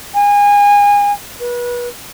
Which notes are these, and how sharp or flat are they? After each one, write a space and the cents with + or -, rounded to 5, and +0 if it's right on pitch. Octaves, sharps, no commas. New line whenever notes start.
G#5 -30
B4 -30